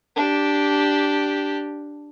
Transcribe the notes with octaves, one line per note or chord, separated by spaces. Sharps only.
D4 G4